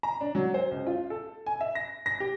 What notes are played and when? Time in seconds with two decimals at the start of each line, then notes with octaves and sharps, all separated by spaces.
0.03 A#5
0.21 D4
0.35 F#3
0.54 C5
0.71 C#2
0.87 F4
1.10 A4
1.46 G#5
1.61 E5
1.75 A#6
2.06 A#6
2.20 G4